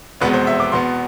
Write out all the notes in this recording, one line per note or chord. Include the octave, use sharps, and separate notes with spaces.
F1 E2 B2 G#3 B3 B4
C5
E5
D6
E2 B2 B3 C6